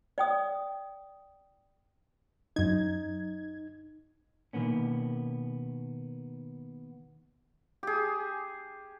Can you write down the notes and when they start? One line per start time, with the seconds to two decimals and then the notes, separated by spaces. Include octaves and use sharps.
0.18 D5 G5 D#6
2.56 F#2 D#4 G#6
4.53 B2 D#3 A#3 B3 C#4
7.83 G4 G#4